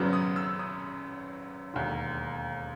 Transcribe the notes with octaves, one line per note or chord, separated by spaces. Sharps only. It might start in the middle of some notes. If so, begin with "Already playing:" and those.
Already playing: G#1 F#2 C#3 F#3 B3
D#6
E6
D#6
E1 D#2 D3